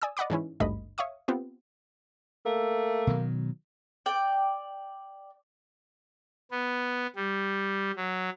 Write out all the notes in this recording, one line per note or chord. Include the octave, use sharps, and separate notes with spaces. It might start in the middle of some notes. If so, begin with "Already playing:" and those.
D5 G#5 D#6 E6
D5 D#5 F#5 B5 D6
G#2 E3 C#4 E4
G#1 D2 G2 A3 D#5 B5
C#5 E5 F5 C#6 D#6
B3 C4 F4 G4
A3 A#3
B2 D#3 F#3
D5 G5
B3
G3
F#3